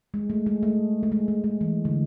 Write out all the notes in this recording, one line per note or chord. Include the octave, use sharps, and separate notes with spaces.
G#3
A3
G#3
A3
A3
G#3
A3
G#3
E3
D3